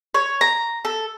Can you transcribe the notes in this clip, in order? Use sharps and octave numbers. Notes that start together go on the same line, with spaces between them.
C#5
A#5
A4